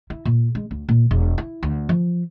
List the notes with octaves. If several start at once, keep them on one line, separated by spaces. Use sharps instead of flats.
E4
A#2
G#3
D2
A#2
E1
E4
D2
F3